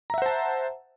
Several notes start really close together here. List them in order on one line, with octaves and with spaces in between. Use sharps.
A#5 E5 F#5 C5 A5